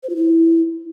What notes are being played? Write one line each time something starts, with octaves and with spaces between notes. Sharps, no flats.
C5
F4
E4